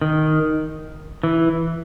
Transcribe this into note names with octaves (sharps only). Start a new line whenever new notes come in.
D#3
E3